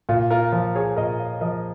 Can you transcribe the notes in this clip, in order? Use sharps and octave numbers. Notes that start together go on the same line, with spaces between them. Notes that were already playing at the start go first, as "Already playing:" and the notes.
A#2 F4
F4 A#4
F3 F4 A#4
G#4 C#5
A#2 A#4 D#5
C#5 F5
F3 A#4 D#5